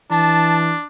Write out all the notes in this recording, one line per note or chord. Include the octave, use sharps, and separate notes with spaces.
E3 D4 A5